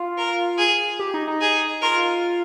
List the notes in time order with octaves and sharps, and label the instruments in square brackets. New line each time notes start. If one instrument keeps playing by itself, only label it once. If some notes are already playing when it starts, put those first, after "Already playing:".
Already playing: [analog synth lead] F4
[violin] A#4
G#4
[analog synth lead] G4
D#4
D#4
[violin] G#4
[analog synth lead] F4 [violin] A#4